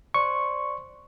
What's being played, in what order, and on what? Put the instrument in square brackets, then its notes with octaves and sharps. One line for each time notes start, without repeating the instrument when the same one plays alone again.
[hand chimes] C5 D5 C6 [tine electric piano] C#6